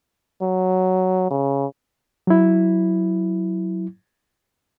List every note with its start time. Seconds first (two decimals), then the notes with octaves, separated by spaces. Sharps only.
0.42 F#3
1.30 C#3
2.27 F#3 E4